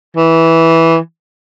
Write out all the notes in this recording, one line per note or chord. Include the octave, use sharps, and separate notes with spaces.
E3